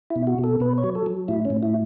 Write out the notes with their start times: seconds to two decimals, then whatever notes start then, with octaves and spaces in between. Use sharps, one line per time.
0.10 E4
0.16 B2
0.27 F#4
0.38 B2
0.44 A4
0.60 B2 B4
0.78 C#5
0.83 F#3
0.95 A4
1.06 F#3
1.28 A2 E4
1.45 C#4
1.50 A2
1.63 E4